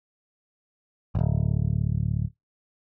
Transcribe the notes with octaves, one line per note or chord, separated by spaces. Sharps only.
D1 G1